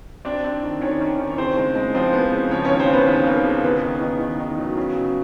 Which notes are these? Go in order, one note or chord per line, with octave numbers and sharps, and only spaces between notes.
C4 D4 D5
C4
D#3
D#3 C#4 C#5
D#3
D#3
C#5
C#3 C4 C5
G#3
G#3
F3 C4 C5
B3
C#3
F3 C#4 C#5
C#4 C#5
D#2
C4 C5
D#2 B3 B4
D#2
A#3
C#3
E2 B3 B4
D#3
D#3
D#3
D#3
F#3
C#3
F#3